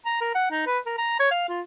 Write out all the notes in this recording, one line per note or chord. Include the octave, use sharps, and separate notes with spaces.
A#5
A#4
F#5
D#4
B4
A#4
A#5
C#5
F5
F4